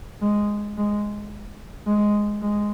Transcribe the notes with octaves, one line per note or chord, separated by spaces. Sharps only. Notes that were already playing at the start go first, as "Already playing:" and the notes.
G#3
G#3
G#3
G#3